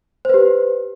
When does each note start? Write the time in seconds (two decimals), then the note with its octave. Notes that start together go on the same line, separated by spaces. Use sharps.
0.25 C5
0.29 B4
0.34 G4